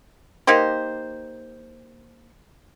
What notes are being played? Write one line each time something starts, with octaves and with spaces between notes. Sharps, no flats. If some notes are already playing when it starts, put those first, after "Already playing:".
A#3 D#4 G4 C5